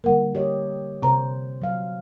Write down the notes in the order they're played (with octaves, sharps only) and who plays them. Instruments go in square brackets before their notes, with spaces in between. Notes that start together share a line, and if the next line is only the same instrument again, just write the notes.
[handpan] D3 G3 A#3 [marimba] A#4 F#5
[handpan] G4 C#5 D#5
[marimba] C3 A#5 [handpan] C4 C5
[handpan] F#3 F5